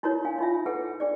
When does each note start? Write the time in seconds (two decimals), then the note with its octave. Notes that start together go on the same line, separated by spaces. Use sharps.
0.03 D#4 E4 F#4 A#4 C#5
0.25 D4 F5 G#5
0.39 D#4 F4 E5
0.66 G#4 A4 B4 F#5
1.00 D4 G#4 D5